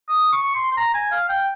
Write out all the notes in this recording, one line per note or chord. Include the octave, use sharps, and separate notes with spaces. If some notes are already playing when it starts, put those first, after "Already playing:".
D#6
C#6
C6
C6
A#5
G#5
F5
G5